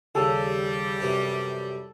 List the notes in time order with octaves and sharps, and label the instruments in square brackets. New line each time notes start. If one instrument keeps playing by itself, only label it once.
[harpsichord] D#2 C#3 [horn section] G3 [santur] A4
[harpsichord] F#2 C3 E3